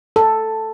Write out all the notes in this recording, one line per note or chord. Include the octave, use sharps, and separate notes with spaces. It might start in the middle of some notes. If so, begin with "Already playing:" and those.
A4